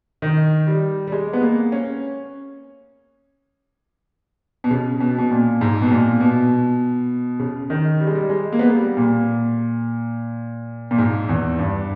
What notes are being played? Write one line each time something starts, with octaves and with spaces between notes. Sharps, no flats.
D#3
G3
G3
G#3
B3
A#3
C#4
B2
C#3
B2
B2
A#2
G#2
B2
A#2
B2
C#3
D#3
G3
G#3
G3
G#3
A#3
B3
A#3
G3
A#2
A#2
G#2
E2
G2